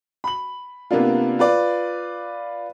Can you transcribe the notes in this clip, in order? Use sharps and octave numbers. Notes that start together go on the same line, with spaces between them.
B5 F#7
C3 A#3 B3 D4 F4
F4 B4 D5